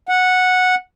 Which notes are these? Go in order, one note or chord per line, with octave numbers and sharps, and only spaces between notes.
F#5